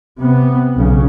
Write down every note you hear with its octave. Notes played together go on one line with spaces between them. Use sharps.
C3 B3
B1 C#3